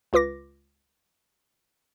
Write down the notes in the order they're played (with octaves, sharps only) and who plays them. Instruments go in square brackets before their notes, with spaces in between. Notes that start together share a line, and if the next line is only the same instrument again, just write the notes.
[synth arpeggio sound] C#2 F4 B4 D6 A#6